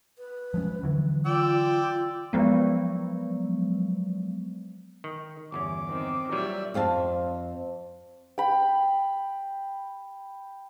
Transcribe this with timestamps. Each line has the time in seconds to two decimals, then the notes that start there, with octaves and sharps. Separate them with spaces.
0.19 B4
0.54 F3 G#3 C#4
0.83 D3 E3 F#3
1.26 F4 D5 G5 E6
2.33 F3 F#3 G#3 B3
5.04 D#3
5.52 G1 E2 C#4 D6
5.88 D#3 C4
6.32 A#2 F#3 G3 D5 E5
6.74 F2 C4 F5 A5
8.38 G5 B5